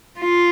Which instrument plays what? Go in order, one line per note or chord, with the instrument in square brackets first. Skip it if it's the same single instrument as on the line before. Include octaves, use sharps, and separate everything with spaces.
[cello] F4